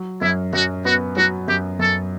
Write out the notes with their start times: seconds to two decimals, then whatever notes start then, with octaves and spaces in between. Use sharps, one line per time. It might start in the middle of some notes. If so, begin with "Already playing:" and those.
Already playing: F#3
0.21 F#2 E4
0.53 F#2 F#4
0.85 B3 F#4
1.17 F#3 F#4
1.48 F#2 G4
1.79 F#2 A4